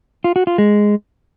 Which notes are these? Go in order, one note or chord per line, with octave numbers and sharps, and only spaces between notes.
F4
F#4
F4
G#3